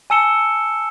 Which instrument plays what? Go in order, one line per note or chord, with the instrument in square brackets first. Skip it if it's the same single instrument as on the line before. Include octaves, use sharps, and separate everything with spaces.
[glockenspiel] G#5 A5 E6 C#7 E7 G7